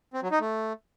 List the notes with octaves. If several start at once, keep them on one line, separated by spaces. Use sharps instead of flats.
C4
F#3
D#4
A3